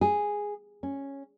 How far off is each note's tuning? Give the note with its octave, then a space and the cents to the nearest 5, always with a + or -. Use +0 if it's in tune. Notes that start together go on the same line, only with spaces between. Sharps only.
G#4 -5
C#4 -5